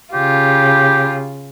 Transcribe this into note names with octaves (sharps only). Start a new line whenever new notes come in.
C#3 F4 G4